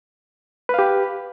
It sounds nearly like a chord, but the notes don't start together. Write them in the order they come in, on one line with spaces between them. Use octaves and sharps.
B4 F5 G4